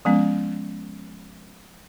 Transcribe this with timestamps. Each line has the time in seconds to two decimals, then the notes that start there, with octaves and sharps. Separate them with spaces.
0.05 F3 G#3 B3 C#4